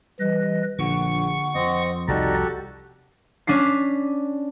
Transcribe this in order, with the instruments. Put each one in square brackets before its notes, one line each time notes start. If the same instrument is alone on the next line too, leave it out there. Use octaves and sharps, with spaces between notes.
[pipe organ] E3 B4 D#5 [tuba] G3
[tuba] A#1 [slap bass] D3 [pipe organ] F#5 C#6
[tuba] F2 [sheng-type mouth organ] C4 D#5
[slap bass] C2 F3 [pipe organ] D#4 D5 D#5 [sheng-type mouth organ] F#4 G4 A4
[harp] C#4 D4 B6 C7